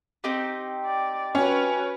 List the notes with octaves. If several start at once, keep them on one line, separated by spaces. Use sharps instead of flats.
C4 D#4 G4
D5
C#4 F#4 B4